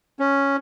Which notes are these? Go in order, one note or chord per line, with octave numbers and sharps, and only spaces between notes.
C#4